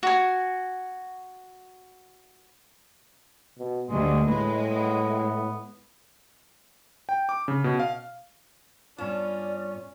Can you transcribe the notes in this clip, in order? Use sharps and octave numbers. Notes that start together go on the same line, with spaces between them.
F#4 G#5
B2
D2 G2 G#3
A2 G#3 B4
B3
G5
D6
C#3
B2
F5
G2 B3 C#4 F4 D5 A5